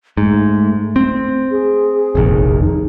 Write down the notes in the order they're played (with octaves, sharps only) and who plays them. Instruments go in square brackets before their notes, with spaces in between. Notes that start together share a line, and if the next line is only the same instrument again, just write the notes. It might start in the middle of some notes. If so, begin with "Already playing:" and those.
[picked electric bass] G#2 [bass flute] A3
[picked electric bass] C4
[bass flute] G#4
[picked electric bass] F1 A#1 D#2
[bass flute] D#4